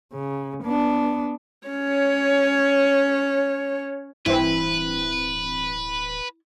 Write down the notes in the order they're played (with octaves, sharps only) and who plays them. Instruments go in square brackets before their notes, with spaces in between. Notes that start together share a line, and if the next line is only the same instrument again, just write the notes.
[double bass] C#3
B3 D4
[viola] C#4 C#5
[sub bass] D1 [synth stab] G2 E3 C4 [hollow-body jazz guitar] E4 [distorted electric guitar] B4